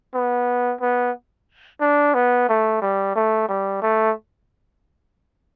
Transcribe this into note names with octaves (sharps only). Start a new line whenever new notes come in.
B3
B3
D4
B3
A3
G3
A3
G3
A3